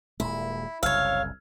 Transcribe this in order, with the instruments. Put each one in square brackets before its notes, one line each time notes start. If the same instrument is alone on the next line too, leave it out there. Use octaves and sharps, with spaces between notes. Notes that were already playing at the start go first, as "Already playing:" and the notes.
[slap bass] D#1 A#2 G#3 [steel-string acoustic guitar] E4
[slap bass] F#1 C2 C#3 [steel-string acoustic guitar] C#5 F5 [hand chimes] E6 F6 G#6